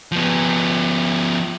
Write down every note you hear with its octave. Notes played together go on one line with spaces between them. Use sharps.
F3 B3